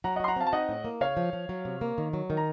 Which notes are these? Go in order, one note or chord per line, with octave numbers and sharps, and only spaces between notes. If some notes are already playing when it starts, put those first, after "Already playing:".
F#3 F#5 A#5
D#5 F#5
F#4 C6
F#5 A#5
C4 F5 A5
A5
D#4 D#5 F#5
A2
A#3
C#3 C#5 F5
F3
F3
F#3
C3
A#3
D#3
F#3
D#3
A#5